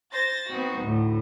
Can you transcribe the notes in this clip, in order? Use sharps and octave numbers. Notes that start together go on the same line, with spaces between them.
C5 A6 A#6
B3 C4 D#4 F#4
D2 A2